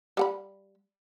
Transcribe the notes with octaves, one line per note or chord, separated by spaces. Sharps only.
G3 F#5 B5